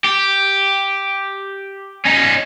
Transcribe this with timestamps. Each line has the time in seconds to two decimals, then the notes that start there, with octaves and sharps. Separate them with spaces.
0.04 G4
2.05 C#4 D#4